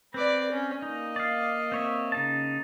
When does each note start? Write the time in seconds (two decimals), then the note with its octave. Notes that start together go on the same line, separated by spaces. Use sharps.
0.14 C4 B4 D5
0.52 C#4
0.82 A#3 D#4 D#5
1.16 D5 F5
1.72 C4 C#5 E5
2.12 C#3 D#4 A5